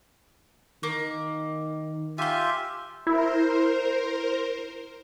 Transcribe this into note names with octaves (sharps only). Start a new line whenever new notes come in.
D#3 A#3
F4 G4 E5 G#5 C6
E4 A#4 C5